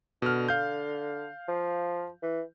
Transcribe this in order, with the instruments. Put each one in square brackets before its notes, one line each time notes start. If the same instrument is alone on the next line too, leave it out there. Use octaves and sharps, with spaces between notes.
[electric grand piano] B2 F6 [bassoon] D3
[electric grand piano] F5 G6
[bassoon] F3
E3